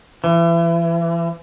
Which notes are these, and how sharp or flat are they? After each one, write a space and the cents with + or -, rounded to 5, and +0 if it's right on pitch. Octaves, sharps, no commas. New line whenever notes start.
E3 +35